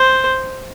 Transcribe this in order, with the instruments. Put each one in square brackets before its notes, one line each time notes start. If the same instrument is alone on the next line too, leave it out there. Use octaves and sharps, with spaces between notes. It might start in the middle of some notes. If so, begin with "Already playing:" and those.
Already playing: [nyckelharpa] C5